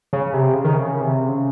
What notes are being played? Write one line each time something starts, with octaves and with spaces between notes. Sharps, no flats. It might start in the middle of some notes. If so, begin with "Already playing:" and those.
C#3
C3
C#3
D#3
C#3
C3
C#3